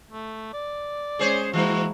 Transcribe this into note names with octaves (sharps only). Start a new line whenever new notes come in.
A3
D5
G#3 C#4 G#4 C5 C#5
E3 G#3 A#3 E4 F#4